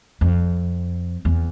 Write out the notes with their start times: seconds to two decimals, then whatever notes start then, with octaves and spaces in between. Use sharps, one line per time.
0.21 F2
1.25 E2